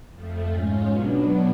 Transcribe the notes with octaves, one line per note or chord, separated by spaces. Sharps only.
F2 F3 A3
G#2 G#3 C#4 F4
B2 F#3 B3 D4